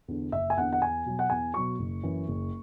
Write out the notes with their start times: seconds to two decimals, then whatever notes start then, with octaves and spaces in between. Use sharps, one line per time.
0.08 E2 D3
0.32 F#1 E5
0.50 G#5
0.57 E2 D3 F#5
0.73 F#5
0.82 E2 G#5
1.05 B2 F#3
1.19 F#5
1.30 E2 G#5
1.54 B2 F#3 C#6
1.79 F#1
2.03 F#2 E3
2.28 F#1